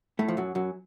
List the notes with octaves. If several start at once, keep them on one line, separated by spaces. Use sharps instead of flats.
A2 A3
F3
F#2 F#3
F#2 F#3